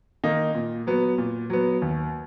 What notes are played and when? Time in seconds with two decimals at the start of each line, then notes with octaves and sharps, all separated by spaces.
0.24 D#3 A#3 D#4
0.55 A#2
0.87 F#3 B3
1.18 A#2
1.50 F#3 B3
1.82 D#2